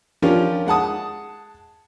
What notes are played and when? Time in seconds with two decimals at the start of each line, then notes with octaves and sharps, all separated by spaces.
0.22 F3 C#4 D4 F4 G4 A#4
0.67 G#3 F#5 A5 D#6